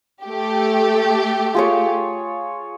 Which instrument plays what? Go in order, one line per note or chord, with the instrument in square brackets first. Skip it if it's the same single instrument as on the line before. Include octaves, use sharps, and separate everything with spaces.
[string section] A3 G4
[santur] F4 G#4 C#5